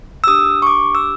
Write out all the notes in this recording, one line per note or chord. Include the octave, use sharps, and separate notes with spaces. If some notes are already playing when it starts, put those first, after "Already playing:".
E6
D4 G4 D#6
C#6
D6
E6